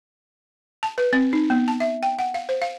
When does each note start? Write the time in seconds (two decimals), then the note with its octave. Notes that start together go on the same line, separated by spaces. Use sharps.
0.83 A5
0.98 B4
1.13 C4
1.33 D#4
1.50 B3
1.68 A5
1.80 E5
2.03 G5
2.19 F#5
2.34 F5
2.49 C5
2.62 F5